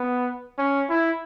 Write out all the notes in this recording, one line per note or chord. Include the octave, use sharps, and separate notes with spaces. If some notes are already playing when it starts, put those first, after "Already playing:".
Already playing: B3
C#4
E4